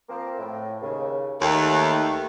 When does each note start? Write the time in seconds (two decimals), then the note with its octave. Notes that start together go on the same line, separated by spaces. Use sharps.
0.09 F3 A#3 C4
0.38 A2
0.81 D#2 C#3
1.42 D#2 D#3 A3